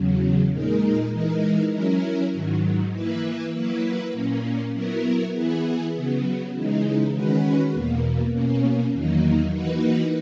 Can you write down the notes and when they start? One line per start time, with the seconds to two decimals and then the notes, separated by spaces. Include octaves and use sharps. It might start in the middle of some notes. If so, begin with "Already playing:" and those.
Already playing: E2 C#3 F#3
0.53 A#2 G#3 D#4 A#4
1.12 E3 G#3 D#4 A#4
1.72 F#3 C#4 E4 A#4
2.33 G#2 D#3 F#3
2.93 E3 A#3 E4 B4
3.53 F#3 A#3 E4 B4
4.13 A#2 A#3 C#4
4.73 F#3 B3 E4 A#4
5.33 E3 B3 E4 G#4
5.93 C#3 F#3 B3
6.53 C#3 E3 G#3 D#4
7.13 D#3 G#3 C#4 F#4 B4
7.73 E2 B2 A#3
8.33 B2 A#3 C#4
8.93 E2 D#3 F#3 A#3 D#4
9.53 E3 A#3 D#4 F#4 B4